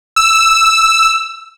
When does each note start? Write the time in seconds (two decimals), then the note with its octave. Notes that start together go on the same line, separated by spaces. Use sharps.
0.16 E6